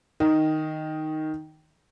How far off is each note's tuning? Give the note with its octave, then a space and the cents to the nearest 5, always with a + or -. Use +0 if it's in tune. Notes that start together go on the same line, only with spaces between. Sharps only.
D#3 +0 D#5 +0